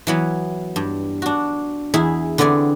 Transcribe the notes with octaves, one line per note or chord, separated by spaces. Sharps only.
E3 F#3 B3
G2
D4 F#4
E2 E4 G#4 E5
D3 B3 C4 D5 G#5